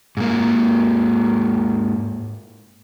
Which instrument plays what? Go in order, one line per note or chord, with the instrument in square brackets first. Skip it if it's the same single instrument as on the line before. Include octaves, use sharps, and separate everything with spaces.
[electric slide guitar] G#2 A#3